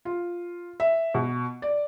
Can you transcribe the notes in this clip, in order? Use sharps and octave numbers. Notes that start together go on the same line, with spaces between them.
F4
E5
B2
D5